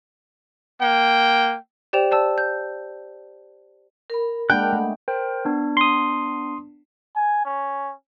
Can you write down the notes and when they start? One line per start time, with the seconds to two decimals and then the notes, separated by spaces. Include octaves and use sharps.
0.80 A#3 G5
1.93 G4 C5 D5 G5 E7 F7
2.11 C5 D5 A5 E6
2.38 G6
4.10 A#4 B5
4.50 G#3 A#3 D4 A#4 F#5 G5 B5 F#6
4.73 A3
5.08 A#4 C5 G5
5.45 B3 D4
5.77 C6 D#6
7.16 G#5
7.45 C#4